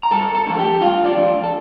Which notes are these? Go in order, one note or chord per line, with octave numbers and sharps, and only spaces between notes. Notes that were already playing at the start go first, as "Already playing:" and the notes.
A#5
G2 A4 A5
A4 A5
F3 A3 D4
G4 G5
G2 F4 F5
D4 D5
F3 A3 D4
A4